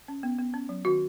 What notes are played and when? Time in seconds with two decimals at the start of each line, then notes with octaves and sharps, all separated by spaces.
0.08 C#4
0.23 B3
0.38 B3
0.54 C#4
0.69 F#3
0.85 D#3 F#4